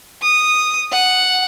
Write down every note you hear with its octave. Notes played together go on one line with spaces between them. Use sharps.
D#6
F#5